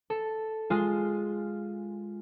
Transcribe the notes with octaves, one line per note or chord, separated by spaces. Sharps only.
A4
G#3 F4